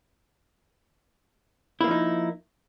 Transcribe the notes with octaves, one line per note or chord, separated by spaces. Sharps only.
F3 A#3 D#4 E4